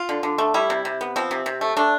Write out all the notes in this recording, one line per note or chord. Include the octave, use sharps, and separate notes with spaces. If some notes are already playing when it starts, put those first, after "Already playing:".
Already playing: F4
D3
D3
A3
G3 E4
C3
C3
B3
F3 C4
C3
C3
A3
A3 D4